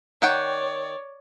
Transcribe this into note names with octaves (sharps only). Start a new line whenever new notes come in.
D#3 C#5 D5 F#5 G5